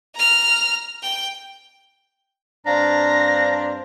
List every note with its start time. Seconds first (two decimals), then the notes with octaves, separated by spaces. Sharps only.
0.15 A#5 F6
1.02 G5
2.66 G2 C4 D4 C5 F5 A#5 A#6